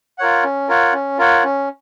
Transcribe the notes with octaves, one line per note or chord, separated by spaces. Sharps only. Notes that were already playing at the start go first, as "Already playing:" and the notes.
F4 A#4 C#5 F#5
C#4
F4 A#4 C#5 F#5
C#4
F4 A#4 C#5 F#5
C#4